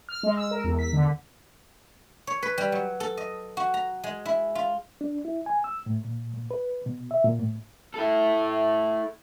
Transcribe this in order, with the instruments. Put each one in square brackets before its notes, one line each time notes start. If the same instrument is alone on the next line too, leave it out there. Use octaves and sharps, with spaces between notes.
[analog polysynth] F6
G#3
E6
A#4
E2
B6
D3
[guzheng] C#5
B4
G3
F#3
A4
D#5
F#4
A#5
G#3
E4
F4
[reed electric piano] D4
E4
G#5
E6
A2
A#2
A#2
B4
B2
E5
A#2
A2
[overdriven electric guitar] E4 A4